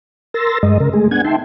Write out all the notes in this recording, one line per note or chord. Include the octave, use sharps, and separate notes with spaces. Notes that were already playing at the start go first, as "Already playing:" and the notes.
A#4 C6 E6 A6 A#6
G2 G#3 D#5
C#3 A#4
G#3 A3 G#4
B3 D4 F#5 G#5 G#6
D#4 E5 G5 A5 C6